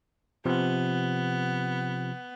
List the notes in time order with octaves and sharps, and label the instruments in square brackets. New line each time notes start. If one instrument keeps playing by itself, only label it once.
[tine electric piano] C3 F3 [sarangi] B3